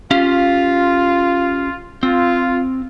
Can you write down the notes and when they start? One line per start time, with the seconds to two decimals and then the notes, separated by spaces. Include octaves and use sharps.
0.11 C#4 F4 G4 F5
2.03 C4 F4